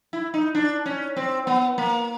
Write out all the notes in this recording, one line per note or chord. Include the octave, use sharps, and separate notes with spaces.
E4
D#4
D4
C#4
C4
B3
A#3